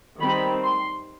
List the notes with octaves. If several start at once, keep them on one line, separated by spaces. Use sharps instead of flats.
D#3 G3 C4 B5
C6